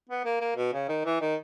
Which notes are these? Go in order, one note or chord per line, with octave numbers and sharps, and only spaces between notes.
B3
A#3
A#3
B2
C#3
D#3
E3
D#3